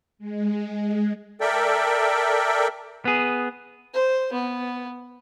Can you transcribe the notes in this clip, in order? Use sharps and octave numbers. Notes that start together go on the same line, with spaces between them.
G#3
A4 A#4 D5 E5 G5
B3 G#4
C5
B3